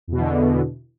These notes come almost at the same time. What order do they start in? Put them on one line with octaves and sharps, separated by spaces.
E2 B2 E3 D3